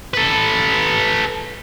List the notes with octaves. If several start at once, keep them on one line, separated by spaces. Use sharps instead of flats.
A4 B4